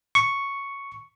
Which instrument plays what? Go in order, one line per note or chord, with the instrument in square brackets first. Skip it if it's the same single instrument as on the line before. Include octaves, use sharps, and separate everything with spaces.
[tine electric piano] C#6